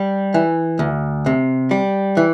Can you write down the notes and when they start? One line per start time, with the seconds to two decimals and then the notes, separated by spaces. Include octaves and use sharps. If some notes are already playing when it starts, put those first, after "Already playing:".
Already playing: G3
0.34 E3
0.79 D2
1.26 C3
1.71 G3
2.17 E3